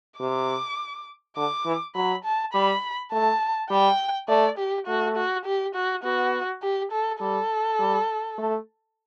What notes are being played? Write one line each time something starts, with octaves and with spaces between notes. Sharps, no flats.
C3 D6
D3 D6
E3
F#3 B5
A5
G3 B5
A3 A5
G3 G5
A3 D5
G4
A3 F#4
F#4
G4
F#4
B3 F#4
G4
A4
G3 A4
G3
A3